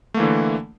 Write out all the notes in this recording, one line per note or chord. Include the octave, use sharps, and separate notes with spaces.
D3 E3 A3 A#3